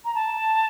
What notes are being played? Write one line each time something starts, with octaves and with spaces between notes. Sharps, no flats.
A#5
A5